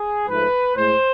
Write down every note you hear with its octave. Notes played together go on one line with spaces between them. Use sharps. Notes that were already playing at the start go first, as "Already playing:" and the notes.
Already playing: G#4
G#2 F3 A3 B4
A2 G#3 C5